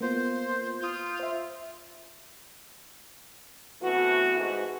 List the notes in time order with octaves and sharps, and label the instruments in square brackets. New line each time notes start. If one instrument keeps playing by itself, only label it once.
[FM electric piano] A#3 B3 F4 [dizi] C5
[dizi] F4 [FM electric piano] D#6 G6
[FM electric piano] C5 E5
[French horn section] E3 A3 B3 C4 F#4
G#2 F#4